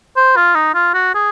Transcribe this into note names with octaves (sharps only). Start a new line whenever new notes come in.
C5
F4
D#4
F4
F#4
G#4